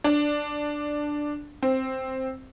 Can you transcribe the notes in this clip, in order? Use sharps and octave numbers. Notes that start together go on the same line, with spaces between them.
D4
C4